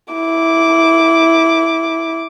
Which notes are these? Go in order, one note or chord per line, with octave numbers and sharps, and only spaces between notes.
E4 D6